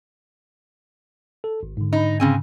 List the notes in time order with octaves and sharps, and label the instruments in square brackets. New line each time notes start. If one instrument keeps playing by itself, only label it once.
[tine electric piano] A4
G#1
G#2 D3
[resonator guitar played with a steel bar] D#4
C#3 C4 G#5